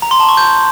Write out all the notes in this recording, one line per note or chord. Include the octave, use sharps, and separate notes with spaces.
A#5
C6
A5
C#6
G6